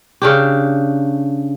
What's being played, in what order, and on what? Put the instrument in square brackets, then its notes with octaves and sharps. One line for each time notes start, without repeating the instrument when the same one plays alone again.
[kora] C#3 D4 G4